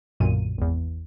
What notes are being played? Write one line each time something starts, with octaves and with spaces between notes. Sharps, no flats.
B1 F#2 A#2 D3 D#7
G#1 E2